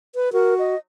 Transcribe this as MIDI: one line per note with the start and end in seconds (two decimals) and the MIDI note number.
0.15 0.32 71
0.33 0.75 66
0.33 0.54 70
0.59 0.78 75